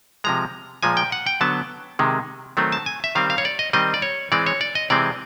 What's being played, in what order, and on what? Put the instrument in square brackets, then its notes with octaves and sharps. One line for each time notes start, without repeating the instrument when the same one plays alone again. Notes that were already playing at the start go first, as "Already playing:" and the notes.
[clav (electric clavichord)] C3 F3 G#3 A#5
A#2 F3 G#3 G#5
G5
F#5
G5
D3 F#3 B3 A5
C3 D#3 G#3
D#3 F#3 A3 C4
A5
G#5
E5
D#3 G3 C4 F5
F5
C#5
D5
D#5
D#3 G3 C4 D#5
D5
C#5
E3 G#3 C4 D5
C#5
D5
D#5
C3 E3 G#3 C4 D5